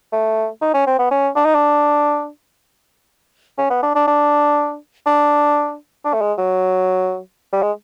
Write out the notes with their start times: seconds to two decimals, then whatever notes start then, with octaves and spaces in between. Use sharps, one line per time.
0.12 A3
0.61 D#4
0.74 C#4
0.86 C4
0.99 B3
1.11 C#4
1.36 D4
1.45 D#4
1.55 D4
3.58 C#4
3.70 B3
3.82 D4
3.95 D4
4.07 D4
5.06 D4
6.05 D4
6.13 A3
6.21 G#3
6.38 F#3
7.53 G3
7.62 G#3